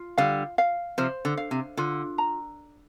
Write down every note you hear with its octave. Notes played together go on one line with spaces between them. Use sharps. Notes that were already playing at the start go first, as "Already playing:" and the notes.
Already playing: F4
D3 G3 F5
F5
C3 F3 C5
D3
F5
C3
D3 F4
A#5